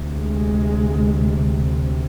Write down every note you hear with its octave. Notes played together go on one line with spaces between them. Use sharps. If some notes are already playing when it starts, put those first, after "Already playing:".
Already playing: D2 C3
G#3